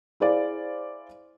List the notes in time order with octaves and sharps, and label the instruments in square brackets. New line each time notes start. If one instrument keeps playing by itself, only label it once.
[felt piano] E4 G#4 C5 D5 F5